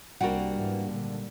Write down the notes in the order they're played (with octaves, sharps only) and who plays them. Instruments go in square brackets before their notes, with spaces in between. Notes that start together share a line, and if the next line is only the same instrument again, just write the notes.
[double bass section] C2 [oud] G3 A#3 [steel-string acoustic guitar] D4 F#4 F#5
[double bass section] G#2 E3
G#1 A#2 D3